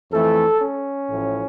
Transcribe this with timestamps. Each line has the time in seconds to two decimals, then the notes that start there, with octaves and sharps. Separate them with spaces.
0.11 F2 E3 A3 A4
0.61 C#4
1.09 A1 A2 F3